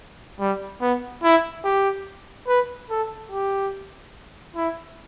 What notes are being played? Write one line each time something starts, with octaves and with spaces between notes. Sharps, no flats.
G3
B3
E4
G4
B4
A4
G4
E4